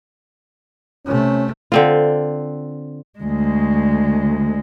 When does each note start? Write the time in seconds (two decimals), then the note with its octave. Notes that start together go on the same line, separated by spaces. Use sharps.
1.06 C3 A3 C#4
1.72 D3 C4 F4
3.20 D2 G#3